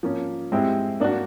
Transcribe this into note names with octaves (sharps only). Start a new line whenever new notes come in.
F3 A#3 C#4
G#3 C4 E4 G4
A#3 D4 F#4